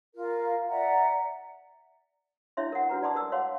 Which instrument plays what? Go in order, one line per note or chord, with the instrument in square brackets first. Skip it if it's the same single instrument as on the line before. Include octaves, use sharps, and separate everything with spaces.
[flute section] F4 A#4
D5 E5 F#5 A#5
[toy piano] D4 E4 C#5 E5 C6
A#4 F#5
D4 F#4 B4 A#5
D5 G#5 A5 C6 D6 D#6
A#4 D#6 E6
C#5 F5 F#5 C6